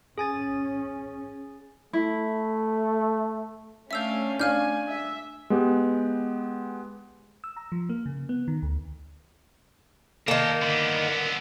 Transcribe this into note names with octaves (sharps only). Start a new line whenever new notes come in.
C#4 G#4 G#5 A6
A3 E4
A3 C#4 D4 E5 F5 E6 G6
D4 F5 G#5 F6 G6
E5
G#3 B3 G4
E6
A#5
F3
A#3
C#3
B3
D#3
D2
D#3 A#3 A#4 A5
D3 B3